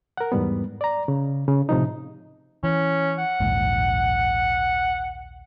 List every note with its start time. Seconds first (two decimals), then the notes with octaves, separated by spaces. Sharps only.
0.17 A#4 F#5
0.32 E2 G#2 G3 B3
0.81 D5 A#5
1.08 C#3
1.48 C#3
1.69 A2 C3 F3 D#4
2.64 E3 C#4
3.19 F#5
3.40 A#1 D#2 G#2